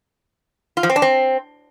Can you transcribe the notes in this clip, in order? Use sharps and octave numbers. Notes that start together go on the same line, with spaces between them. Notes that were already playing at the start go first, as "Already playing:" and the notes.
F4
F3
C4
D4
C4